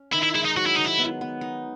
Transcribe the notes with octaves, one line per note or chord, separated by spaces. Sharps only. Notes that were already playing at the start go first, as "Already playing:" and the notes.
Already playing: C#4
D#3 E4
E4
G#3 E4
D#4
F#3 F#4
E4
D#3 D#4
E4
B3
B3
D#4